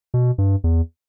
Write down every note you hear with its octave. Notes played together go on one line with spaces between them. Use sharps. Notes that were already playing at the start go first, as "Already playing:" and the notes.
B2
G2
E2